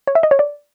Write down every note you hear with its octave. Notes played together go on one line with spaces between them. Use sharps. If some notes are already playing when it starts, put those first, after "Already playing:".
C#5
E5
D#5
C#5
D5